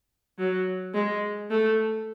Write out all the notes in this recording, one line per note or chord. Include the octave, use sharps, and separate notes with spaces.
F#3
G#3
A3